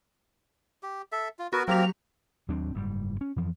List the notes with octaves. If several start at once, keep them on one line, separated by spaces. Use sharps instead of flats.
G4
A4 E5
F4
B3 F#4 A#4 B4
F#3 A#3 C4 G4 A#4 F7
D#2 F#3 C4 D4
F#1 G#2 G3
C#4
F2 E3 F3